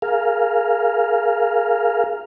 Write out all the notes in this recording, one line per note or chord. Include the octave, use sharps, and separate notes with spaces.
G#4 A#4 F5